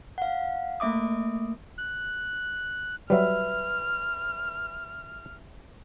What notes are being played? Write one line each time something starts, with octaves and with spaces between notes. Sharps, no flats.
F5 F#5
A3 A#3 E5 D6 D#6
F#6
F#3 G3 B4 E5 F6